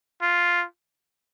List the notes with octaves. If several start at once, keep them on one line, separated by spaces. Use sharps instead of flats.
F4